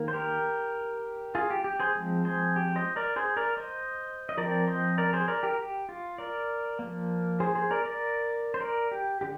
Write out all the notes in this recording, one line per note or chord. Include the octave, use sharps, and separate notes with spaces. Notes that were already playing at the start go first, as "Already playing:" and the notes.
Already playing: D#3 A#3
C5
G4 A#4
F4 G#4
G4
G4
G#4 C5
F3 G#3 C4
G#4 C5
G4
C5 D#5
A#4 D5
G#4 C5
A#4 D5
C5 D#5
D#5
F3 C4 A#4 D5
C5 D#5
A#4 D5
G#4 C5
A#4 D5
G4 A#4
G4
F4
A#4 D5
F3 A#3
G#4 C5
G#4 C5
A#4 D5
A#4 D5
C5
A#4 D5
G4
D3 G4